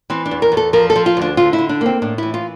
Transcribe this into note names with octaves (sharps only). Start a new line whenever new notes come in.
E3 C4
D4
E2
A#4
E2
A4
F3 A#4
A4
F3
F4
D2 D4
D3 F4
E4
D3
D4
A#3 C4
A2 D4
E3 E4
F4